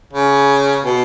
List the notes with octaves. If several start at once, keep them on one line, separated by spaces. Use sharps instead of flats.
C#3
B2